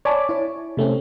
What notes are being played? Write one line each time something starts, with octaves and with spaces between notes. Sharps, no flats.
C#5 D5 G#5 A5 B5 D6
E4 C#5
C3 A3 C4 C#4